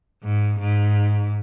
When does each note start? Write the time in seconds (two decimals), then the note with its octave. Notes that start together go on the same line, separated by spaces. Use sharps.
0.23 G#2
0.60 G#2